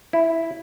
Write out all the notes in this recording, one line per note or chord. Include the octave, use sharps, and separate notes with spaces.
E4